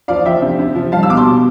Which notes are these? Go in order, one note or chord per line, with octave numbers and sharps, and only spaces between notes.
F3 D5 F5
F3 E5 G5
C3
C3
F3
G3 F5 A5
E6
B2 D6
A5 C6
B2